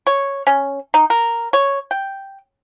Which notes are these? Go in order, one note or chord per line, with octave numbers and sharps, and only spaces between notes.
C#5
C#4
D#4
A#4
C#5
G5